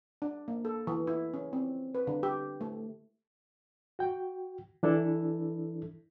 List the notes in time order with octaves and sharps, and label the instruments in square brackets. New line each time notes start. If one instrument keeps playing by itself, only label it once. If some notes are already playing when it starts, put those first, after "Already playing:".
[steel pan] D4
A#3
A4
E3
E4
C#4
C4
B4
D3
G4
A3
[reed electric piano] F#4 G5
E3 D4 E4 A4